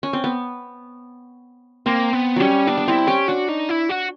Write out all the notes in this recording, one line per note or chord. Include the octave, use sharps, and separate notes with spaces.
C#4
C4
B3
A#3 C4
B3
F#3 G3 C#4
B3 D4
B3
C4 E4
C#4 G4
D4 F#4
D#4
E4
F#4